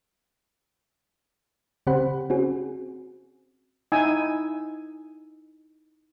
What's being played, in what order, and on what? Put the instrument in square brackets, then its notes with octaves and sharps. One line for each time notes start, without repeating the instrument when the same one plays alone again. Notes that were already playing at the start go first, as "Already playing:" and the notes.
[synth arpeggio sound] C#3 C4 G4 C5 F#5 B5
C4 C#4 F#4 G#4
[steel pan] D#4 E4 G#5 E6